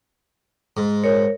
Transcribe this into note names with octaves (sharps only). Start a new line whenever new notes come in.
G#2
A#4 C#5